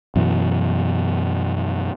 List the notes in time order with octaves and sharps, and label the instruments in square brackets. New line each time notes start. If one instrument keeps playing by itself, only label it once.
[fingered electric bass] F#2 B2 E3